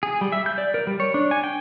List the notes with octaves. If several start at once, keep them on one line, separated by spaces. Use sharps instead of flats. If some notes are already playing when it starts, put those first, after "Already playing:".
G#4
G3
E5
G6
D5
A#4
G3
C#5
D4
G#5
G5